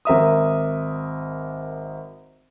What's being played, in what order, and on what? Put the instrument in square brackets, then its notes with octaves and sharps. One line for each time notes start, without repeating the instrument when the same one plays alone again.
[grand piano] G#1 A#4 E5 D#6